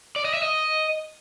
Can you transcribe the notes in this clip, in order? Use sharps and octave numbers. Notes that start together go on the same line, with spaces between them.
D5
D#5
E5
D#5